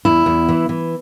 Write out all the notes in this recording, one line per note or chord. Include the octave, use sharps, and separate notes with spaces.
E2 E4
E2
E3
E3